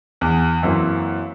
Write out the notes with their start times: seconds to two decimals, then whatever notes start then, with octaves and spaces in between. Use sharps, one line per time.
0.21 E2
0.63 F#2 E3 A#3 C4